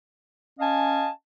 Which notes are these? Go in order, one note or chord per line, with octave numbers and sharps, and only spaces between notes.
C#4 D#5 F5 G#5 A5